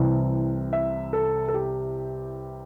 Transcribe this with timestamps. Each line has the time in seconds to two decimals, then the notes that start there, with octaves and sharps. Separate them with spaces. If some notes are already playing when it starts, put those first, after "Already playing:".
Already playing: C2 C3 E3
0.73 E5
1.13 A4
1.48 A4
1.54 G4